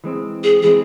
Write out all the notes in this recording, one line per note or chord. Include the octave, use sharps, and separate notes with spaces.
E3 G#3 C4
G#4
E3 G#3 C4 G#4